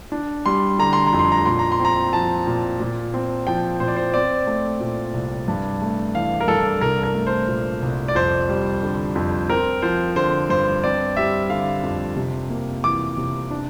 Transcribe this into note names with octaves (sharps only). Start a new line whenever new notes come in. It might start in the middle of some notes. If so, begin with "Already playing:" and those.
D4
G3 C6
D3 A#5
C6
A#5
F2
C6
A#5
A#2 C6
A#5
C6
C4
A#5
F3 A5
A#2
A#2
C4
F3 G5
A#2 C5
D5
C5
C4 D5
A3
A#2
C2
G2
A3
E3 F5
A#4
G2 A4
C2 A#4
A#4
A3
C5
A#2
C2
D5
F2 C5
G3
D3
F2
C4 A#4
F3 C5
D3 C5
G2 C5
C4 D5
G3 E5
D3 F5
F2
C3
A#3
E3 D6
C3
D4